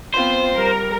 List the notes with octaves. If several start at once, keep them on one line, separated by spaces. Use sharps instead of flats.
B3 C4 F4 C5
G3 A#4